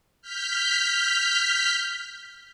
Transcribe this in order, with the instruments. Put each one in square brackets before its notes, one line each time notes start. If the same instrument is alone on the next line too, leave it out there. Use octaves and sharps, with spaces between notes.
[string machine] F6 G6 B6